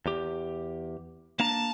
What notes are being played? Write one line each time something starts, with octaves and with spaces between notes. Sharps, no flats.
E2 G4
A#3 D4 A5 A#5